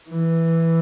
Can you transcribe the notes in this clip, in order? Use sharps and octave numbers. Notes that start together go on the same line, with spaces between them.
E3